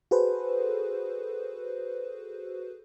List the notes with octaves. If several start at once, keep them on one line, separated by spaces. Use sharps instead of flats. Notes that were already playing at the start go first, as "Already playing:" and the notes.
F#4 G#4 A4 B4 C5